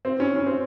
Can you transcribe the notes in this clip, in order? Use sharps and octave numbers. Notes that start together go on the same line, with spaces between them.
C4
C#4
C#4
C4